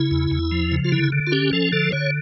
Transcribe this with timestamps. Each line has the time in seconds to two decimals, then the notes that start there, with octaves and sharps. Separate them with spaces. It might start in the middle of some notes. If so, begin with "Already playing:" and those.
Already playing: C#3 E4
0.11 E2
0.31 E2
0.52 F3
0.72 C#3
0.85 F4
0.92 D3 E4
1.12 D3
1.27 F4
1.32 C#4 G4
1.53 F3 A4
1.72 D3 A4
1.92 D3 C#5